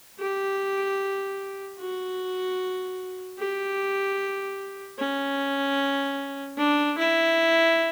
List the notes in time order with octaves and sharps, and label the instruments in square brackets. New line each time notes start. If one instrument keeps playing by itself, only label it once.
[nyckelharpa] G4
F#4
G4
C#4
D4
E4